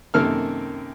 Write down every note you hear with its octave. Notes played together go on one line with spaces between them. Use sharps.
F#2 C3 D#3 A#3 A4 F6